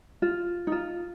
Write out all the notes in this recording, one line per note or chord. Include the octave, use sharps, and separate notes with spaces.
F4
D#4
F4